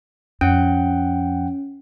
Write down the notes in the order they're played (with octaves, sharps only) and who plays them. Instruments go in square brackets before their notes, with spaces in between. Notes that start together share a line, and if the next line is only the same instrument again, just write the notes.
[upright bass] F2 [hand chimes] C#4 [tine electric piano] F#5 G5